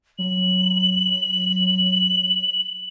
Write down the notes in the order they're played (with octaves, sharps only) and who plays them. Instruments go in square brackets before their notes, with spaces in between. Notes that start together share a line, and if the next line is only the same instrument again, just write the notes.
[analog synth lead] F#3 [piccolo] F#7